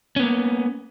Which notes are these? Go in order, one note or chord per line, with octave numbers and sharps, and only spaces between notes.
A#3 B3 C#4